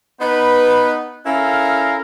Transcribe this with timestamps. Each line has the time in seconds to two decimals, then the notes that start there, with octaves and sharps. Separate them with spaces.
0.21 B3 D#4 B4
1.26 C#4 E4 A4 A#4 F5